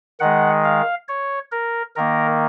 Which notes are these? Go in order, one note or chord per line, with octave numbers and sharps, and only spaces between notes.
D#3 G#3 F#5
F5
C#5
A#4
D#3 A#3 A#4